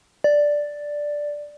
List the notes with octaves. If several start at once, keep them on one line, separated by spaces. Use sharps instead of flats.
D5